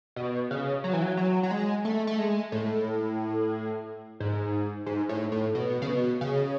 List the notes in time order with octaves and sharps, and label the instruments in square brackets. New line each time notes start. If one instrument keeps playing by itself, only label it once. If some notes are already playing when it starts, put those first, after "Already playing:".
[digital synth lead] B2
C#3
F#3
E3
F#3
F#3
F#3
G#3
A3
A3
G#3
A2
G#2
G#2
A2
A2
B2
C#3
B2
C#3